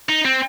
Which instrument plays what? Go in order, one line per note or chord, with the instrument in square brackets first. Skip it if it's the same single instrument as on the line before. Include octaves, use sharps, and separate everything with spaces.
[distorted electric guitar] D#4
C4